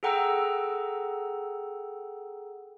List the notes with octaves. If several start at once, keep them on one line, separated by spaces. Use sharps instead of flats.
G#4 A4 F#5 G5 A#5 E6